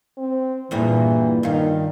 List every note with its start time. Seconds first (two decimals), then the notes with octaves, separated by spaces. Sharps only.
0.17 C4
0.71 E2 G2 A#2 E3
1.43 G2 D#3 F4